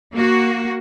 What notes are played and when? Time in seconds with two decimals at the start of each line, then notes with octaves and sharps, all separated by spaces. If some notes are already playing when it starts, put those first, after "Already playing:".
0.14 A#3 F#4